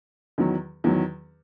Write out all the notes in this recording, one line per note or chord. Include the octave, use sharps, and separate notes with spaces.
E2 D#3 F#3
E2 D#3 F#3